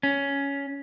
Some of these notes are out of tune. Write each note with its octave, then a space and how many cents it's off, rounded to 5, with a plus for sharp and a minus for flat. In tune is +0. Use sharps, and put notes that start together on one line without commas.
C#4 +10